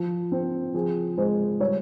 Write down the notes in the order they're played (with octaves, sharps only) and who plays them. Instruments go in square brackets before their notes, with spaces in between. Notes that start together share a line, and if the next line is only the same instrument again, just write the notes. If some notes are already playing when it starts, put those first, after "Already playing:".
Already playing: [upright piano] F3
C4
F3 G#4
G#3 C5
G3 C#5